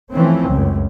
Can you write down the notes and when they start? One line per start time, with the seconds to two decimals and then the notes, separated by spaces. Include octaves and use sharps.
0.11 E3 F3 A3 C4 C#4
0.48 C#2 F#2